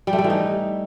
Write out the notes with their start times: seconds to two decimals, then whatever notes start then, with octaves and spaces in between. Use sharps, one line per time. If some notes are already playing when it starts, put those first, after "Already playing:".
0.07 G3
0.13 A3
0.19 G3
0.24 E3
0.30 D#4